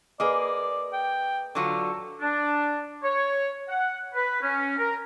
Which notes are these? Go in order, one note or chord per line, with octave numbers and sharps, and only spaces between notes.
A#3 G#4 B4 D5 D#5
G5
D3 F#3 F4 A4
D4
C#5
F#5
B4
C#4
A#4